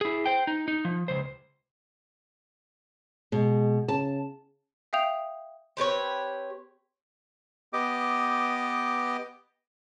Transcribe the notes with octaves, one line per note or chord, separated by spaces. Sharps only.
E4 G#4
C5 G5
D#4
D#4
F3
C#2 C5
B2 G#3
C#3 A5
E5 F5 G5 D#6 G6 F7
C4 G4 B4 C#5
B3 G4 D#5 D6